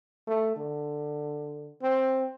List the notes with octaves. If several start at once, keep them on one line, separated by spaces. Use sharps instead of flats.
A3
D3
C4